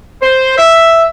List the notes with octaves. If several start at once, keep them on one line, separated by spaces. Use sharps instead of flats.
C5
E5